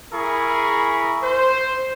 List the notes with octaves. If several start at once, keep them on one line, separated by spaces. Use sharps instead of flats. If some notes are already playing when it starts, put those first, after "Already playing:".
E4 G#4 A#4 B5 C#6
C5